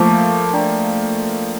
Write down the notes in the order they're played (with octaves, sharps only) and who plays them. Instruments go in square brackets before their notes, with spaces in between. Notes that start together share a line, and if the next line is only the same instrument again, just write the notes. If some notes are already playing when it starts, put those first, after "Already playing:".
Already playing: [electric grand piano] F3 A3 A#3 [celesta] C5 F5 A5 D6
[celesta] D4 A4 D5 G5 A#5